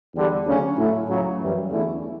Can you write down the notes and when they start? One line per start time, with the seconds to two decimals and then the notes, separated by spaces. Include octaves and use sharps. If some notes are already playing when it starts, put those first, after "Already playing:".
0.15 E2 D3 G3 D4
0.46 D2 C#3 F#3 C#4
0.78 A2 F#3 A3 E4
1.09 C#2 C#3 F#3
1.41 F#2 E3 G3
1.71 E2 D3 A3 C#4 E4